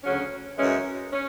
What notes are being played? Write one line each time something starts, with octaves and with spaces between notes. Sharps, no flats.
D2 C#3 F#3 C#4
F#2 E3 G#3 C#4
C#4